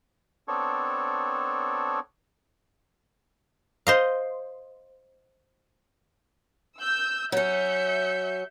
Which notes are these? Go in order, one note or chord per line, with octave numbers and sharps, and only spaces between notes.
B3 C4 D4 A4 C#5
C5 D#5 F5
E6 G6
F#3 C#4 E5 G6 C#7